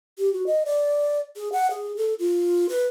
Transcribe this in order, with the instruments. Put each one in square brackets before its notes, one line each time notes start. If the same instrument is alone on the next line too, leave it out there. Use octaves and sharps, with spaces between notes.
[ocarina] G4
F#4
D#5
D5
G#4
F#5
G#4
A4
F4
B4